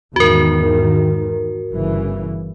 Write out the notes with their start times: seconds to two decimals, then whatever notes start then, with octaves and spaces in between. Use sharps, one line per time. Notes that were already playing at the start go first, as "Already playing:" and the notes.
0.16 E2 G#2 D#3 F#4 A#4
1.73 G1 C#3 E3